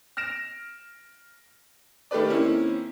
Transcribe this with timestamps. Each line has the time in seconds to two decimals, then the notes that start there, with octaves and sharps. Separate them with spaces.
0.17 F6 A#6 D7 E7
2.11 D#3 A3 G4 B4 D5
2.29 D#3 A#3 C4 C#4 E4